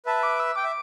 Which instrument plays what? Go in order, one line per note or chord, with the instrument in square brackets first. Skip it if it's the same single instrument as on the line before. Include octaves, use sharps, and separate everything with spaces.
[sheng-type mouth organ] B4 E5 [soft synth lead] A5
[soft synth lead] D6
E6
[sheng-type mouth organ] G5 [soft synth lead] D6
[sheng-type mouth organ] E5